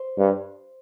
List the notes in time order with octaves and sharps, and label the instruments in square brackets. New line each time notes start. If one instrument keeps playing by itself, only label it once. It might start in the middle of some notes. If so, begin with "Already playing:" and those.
Already playing: [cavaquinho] C5
[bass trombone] G2